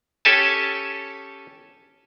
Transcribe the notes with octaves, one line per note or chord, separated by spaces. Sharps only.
C#4 G4 A4 G#5 A5